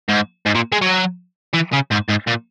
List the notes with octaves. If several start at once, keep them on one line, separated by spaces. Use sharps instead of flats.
G#2
G#2
A#2
G#3
F#3
E3
C#3
G#2
G#2
A#2